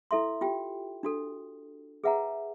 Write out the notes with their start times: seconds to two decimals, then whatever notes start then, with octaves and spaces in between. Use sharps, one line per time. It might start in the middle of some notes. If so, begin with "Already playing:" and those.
0.11 E4 A4 E5 C6
0.41 F4 G4 G5
1.03 D4 F#4 A4
2.04 G#4 B4 E5 F#5 G#5 A#5